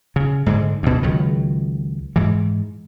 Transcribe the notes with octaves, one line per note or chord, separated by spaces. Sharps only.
C#3
G#2 D3 G#3
D2 B2
C#2 D#3 F#3
G#2 E3